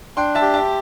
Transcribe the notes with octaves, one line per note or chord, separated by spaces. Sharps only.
D4 G5 C6
E5 A5
G4
E5 A5